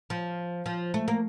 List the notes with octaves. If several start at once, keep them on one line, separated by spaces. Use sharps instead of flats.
F3
F3
A3
A#3